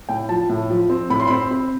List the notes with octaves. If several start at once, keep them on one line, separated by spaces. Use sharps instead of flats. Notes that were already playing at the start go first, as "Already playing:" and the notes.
A2 G5
F3 A5
A2
F3
C4
A2 B5
C6
C4 B5
C4